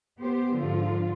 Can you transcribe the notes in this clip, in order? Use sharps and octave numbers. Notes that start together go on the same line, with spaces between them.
B3 G4 C5
G#2 D3 F3 F4